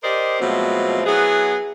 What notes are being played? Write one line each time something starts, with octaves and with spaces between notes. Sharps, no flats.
G4 A#4 C5 D5 D#5
B2 F3 F#3 G#3 A3 C4
F#3 B3 E4 G#4